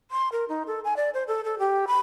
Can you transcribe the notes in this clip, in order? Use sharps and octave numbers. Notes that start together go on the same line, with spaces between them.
C6
A#4
D#4
A4
G#5
D5
C5
A4
A4
G4
B5